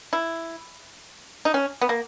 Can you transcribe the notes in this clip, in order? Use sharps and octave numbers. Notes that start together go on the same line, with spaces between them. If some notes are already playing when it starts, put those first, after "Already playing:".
E4
D#4
C#4
B3
A#3